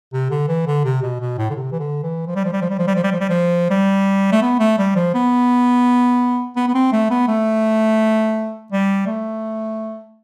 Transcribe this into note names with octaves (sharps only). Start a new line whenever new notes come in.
C3
D3
E3
D3
C3
B2
B2
A2
D3
C3
E3
D3
E3
F3
G3
F3
G3
F3
G3
F3
G3
F3
G3
F3
G3
F3
G3
A3
B3
A3
G3
F3
B3
B3
B3
C4
A3
B3
A3
G3
A3